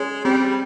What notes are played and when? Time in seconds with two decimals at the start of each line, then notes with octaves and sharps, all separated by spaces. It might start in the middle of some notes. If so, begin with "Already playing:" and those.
Already playing: G#3 C#4
0.24 G3 C4